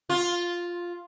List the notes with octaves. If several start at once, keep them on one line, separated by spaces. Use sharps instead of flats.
F4